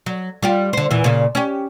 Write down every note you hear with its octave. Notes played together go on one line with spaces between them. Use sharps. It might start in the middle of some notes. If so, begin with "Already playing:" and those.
F#3
G3 F4 G4
D3 C5
E2 A#2 E3
A#2 C#3
C#4 G4